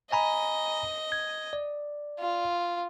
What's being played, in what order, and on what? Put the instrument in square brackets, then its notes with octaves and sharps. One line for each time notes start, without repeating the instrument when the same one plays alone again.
[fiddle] D#5 [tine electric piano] G#5 A#5 B5
[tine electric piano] G#6
D5
[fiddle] F4